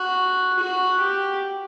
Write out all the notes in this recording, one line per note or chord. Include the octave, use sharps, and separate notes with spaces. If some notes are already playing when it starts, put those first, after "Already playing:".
Already playing: F#4
F#4
G4